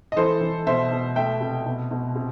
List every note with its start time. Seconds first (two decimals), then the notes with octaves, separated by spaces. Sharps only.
0.12 D#5
0.16 E3 A4 C5
0.41 E3
0.67 B2 C5 E5
0.91 B2
1.16 A3 E5 G5
1.41 C3
1.66 B2
1.91 B2
2.15 C3